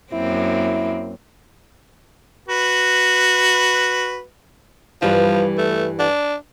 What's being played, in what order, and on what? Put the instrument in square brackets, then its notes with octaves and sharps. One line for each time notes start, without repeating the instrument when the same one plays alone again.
[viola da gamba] F#2 A#3 C4 [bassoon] E4
[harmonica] F#4 B4
[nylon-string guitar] G2 E3 G3 [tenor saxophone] F3
[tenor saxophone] A3
D4